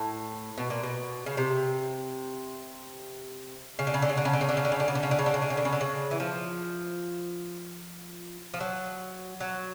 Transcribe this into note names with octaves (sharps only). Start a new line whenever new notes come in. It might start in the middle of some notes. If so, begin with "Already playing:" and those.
Already playing: A2
B2
A#2
B2
C#3
C3
C#3
D3
C#3
D3
C#3
D3
C#3
D3
C#3
D3
C#3
D3
C#3
D3
C#3
D3
C#3
D3
C#3
D3
C#3
D3
C#3
D3
C#3
D3
C#3
E3
F3
F3
F#3
F#3